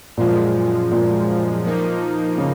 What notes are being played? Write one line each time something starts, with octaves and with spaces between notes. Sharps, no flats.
F#2 A#2 F3 G#3
A#2
F3 A#3 D#4
C#3